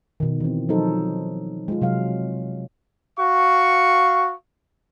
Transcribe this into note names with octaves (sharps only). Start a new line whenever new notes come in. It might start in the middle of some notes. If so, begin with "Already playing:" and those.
B2 D#3
E3 C4
F3 F#3 D#4 A4 C5
G#3 F4
C3 F#3 F5
F#4 F5 C#6